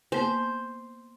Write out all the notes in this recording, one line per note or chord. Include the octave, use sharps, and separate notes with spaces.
A#3 B3 C5